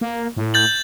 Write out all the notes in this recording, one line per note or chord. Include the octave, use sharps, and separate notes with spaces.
A#3
A2
G6 A6 F#7